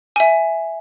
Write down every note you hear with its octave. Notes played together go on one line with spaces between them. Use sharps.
E5 G#5